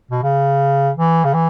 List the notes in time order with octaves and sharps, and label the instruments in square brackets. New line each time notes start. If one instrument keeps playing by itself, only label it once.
[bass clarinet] B2
C#3
E3
C#3
E3